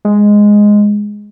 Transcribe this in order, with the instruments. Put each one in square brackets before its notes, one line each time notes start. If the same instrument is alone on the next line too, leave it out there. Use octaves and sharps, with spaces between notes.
[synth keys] G#3